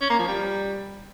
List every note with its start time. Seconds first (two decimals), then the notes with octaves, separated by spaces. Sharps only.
0.01 C#4
0.10 A#3
0.19 F3
0.28 G3